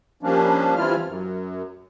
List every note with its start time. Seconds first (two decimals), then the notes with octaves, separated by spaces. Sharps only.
0.23 F3 G3 A#3 C#4 D4
0.77 E3 G3 C4 E4 F4 F6
1.06 F#2